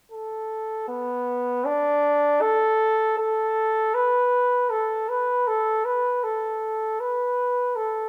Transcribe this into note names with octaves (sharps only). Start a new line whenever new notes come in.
A4
B3
D4
A4
A4
B4
A4
B4
A4
B4
A4
B4
A4